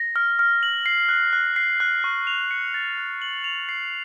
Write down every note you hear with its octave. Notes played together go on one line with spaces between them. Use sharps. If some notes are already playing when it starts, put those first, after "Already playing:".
Already playing: A#6
F6
F6
F#7
C7
F#6
F#6
C7
F#6
C#6
F7
C#7
A6
F#6
F#7
F7
C7